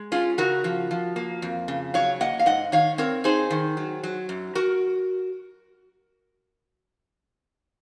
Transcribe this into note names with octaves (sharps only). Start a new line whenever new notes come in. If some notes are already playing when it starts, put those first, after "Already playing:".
Already playing: G#3
C#4 F4 G#4
C#3 F#4 A#4
F3
F3
A#3
F2
C#3
F#3 C#5 F5
A#3 D#5 F#5
F5
G#2 D#5 F#5
D#3 C#5 F5
C4 A#4 C#5
D#4 G#4 C5
D#3
F#3
F#3
F#2
F#4 A#4